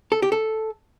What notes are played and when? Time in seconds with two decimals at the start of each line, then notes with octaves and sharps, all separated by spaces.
0.12 A4
0.22 G4
0.32 A4